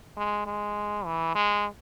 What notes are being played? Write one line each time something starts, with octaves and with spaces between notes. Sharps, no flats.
G#3
G#3
E3
G#3